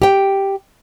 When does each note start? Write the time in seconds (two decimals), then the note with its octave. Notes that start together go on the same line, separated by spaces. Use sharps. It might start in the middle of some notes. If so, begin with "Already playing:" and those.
0.02 G4 G5